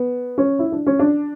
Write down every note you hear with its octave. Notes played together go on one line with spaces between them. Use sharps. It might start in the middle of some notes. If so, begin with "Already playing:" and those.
Already playing: B3
C#4
E4
D4
C#4
D4